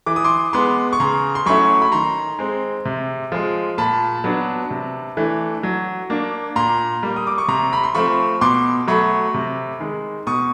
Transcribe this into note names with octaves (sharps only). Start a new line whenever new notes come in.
E3 D6
D#6
C6 D6
G#3 B3 C6 D6
C#6
C#3 A#5 C6
C6
F#3 A3 C#4 E4 B5 C#6
B5
D#3 A#5 C6
G#3 C4
C3
F3 G#3
A#2 A5 B5
F#3 B3 D4
C3
E3 A3 D4
F#3
A#3 D4
A#2 A#5 C6
G3 A#3
D#6
D6
C#6
C3 A#5 C6
B5
C6
F3 A3 C4 B5 C#6
B2 C6 D6
F#3 A3 B5 C#6
C3
D#3 G#3
B2 C#6 D#6